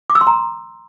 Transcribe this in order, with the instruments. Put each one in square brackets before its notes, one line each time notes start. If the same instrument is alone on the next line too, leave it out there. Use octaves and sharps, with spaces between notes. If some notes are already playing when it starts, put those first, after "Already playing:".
[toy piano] D6
E6
C6
A#5